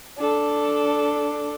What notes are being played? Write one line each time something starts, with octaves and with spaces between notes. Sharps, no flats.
D4 A4